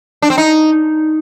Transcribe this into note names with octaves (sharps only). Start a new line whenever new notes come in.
D4
C4
D#4